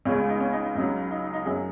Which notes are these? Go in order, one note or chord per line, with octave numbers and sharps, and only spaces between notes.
C#2 C#3 G#3 C#4
D#4
C#4
D#4
D#4
C#2 C#3 F#3 D#4
D#4
D#4
D#4
F#2 F#3 G#4